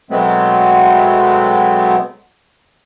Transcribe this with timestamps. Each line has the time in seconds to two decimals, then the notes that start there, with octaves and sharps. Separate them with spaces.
0.11 B2 F#3 G#3 A3 B3 C4